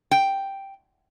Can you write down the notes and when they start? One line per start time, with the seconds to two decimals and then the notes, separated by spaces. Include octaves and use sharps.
0.11 G5